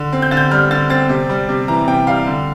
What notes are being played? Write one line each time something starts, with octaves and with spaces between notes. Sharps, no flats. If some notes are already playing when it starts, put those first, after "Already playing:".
Already playing: D3
C4
G6
D3 A6
G6
G3 F6
D3 A6
C4 A6
C3
G3
C3
E3 A#5
C3 G5
G3 F5
D3